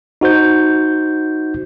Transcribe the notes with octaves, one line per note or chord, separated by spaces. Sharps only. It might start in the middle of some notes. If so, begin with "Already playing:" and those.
D#4 F#4 C5 G6